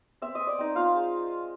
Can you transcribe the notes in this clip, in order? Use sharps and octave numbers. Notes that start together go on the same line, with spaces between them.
C4 E5
C4 D#5
D5
C4 D#4 D#5
C4 F4 F5
G#3